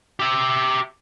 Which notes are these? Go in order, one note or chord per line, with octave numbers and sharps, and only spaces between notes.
G4 E5